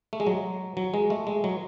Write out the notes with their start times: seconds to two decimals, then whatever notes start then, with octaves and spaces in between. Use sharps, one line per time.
0.13 A3
0.20 G#3
0.27 F#3
0.77 F#3
0.94 G#3
1.10 A3
1.27 G#3
1.44 F#3